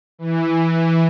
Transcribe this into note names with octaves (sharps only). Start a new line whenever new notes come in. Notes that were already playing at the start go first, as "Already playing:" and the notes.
E3